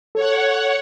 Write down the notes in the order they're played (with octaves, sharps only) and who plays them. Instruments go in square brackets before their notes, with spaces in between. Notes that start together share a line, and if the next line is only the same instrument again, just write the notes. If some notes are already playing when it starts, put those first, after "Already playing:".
[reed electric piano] A4 [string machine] C#5 F#5